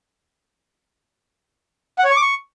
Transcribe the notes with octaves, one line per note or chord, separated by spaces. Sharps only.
F#5
C#5
C#6
D6
C#6